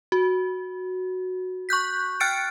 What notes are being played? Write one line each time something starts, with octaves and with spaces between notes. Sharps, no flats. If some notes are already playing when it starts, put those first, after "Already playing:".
F#4
C#6 F#6 G6 B6
G5 F6 F#6 A6 C#7 D7